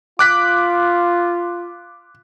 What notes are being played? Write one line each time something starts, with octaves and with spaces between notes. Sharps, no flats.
F4 D6 F#6 B6